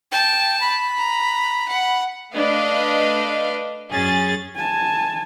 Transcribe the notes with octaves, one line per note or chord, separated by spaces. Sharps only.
G5 A5
B5
A#5
F#5
A3 D4 B4 D#5 F5
F#2 C#4 G#4 A6
G#5 A5